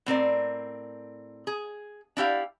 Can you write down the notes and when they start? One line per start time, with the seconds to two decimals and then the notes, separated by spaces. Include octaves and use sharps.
0.06 A2 C4 A#4 D5
1.47 G#4
2.17 D4 E4 G4 F5